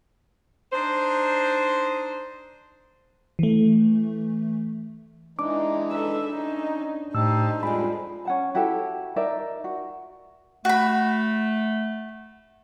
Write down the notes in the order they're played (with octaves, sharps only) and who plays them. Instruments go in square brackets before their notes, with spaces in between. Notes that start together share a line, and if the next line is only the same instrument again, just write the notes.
[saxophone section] D4 D#4 C5
[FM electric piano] E3 A3
[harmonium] E3 G#3 D#4 [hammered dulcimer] D4 [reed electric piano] D6
[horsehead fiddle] A4 E5 [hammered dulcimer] B4
[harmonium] C#4 [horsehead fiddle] D#4
[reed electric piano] A2 E6 [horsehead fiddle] D#4 C5 [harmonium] G4 A5
[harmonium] F2 F3 G3 [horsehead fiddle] G#3 F4 [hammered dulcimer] D4 G5 [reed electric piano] B5
[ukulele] C#4 F#5 A5
E4 F#4 G4 A4
D#4 A#4 D5 E5
F#4
[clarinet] A3 [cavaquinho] F#4 B5